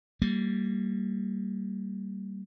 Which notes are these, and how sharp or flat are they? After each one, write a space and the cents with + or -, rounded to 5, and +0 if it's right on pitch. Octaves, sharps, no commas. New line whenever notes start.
G3 -15 A#3 -20